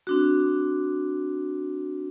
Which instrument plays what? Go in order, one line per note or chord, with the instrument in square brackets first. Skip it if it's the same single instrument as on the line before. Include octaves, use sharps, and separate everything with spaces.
[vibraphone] C4 D4 F#4